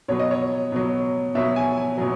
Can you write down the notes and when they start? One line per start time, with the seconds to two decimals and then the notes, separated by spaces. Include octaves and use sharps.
0.08 B2 F#3 C#5
0.19 D#5
0.31 C#5
0.72 B2 F#3
1.35 B2 F#3 E5
1.56 G#5
1.77 G#5
1.98 B2 F#3